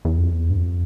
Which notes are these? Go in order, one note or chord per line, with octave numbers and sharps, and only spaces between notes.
E2
F2
E2
G2
F2